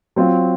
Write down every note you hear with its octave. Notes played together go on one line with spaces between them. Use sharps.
F#3 C4 F4